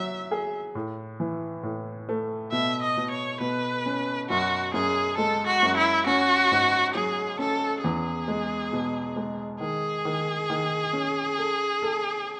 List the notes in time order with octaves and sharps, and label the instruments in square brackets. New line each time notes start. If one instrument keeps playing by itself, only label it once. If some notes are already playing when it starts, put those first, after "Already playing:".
Already playing: [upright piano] F#3 [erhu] E5
[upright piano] G#4
A2
E3
A2
A3
[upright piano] B2 [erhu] E5
[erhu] D#5
[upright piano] B2
[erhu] C#5
[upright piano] B2 [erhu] B4
[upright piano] C#4
[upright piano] F#2 [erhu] F#4
[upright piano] F#2 [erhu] G#4
[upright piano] G#3 [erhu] A4
[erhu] F#4
[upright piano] F#2
[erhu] E4
[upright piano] C#4 [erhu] F#4
[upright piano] G#2
[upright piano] F#3 [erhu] G#4
[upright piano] C#4 [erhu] A4
[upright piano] E2 [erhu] G#4
[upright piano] G#3
B2
G#3
[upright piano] D#3 [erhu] G#4
[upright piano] D#3
D#3
C#4
A4
A4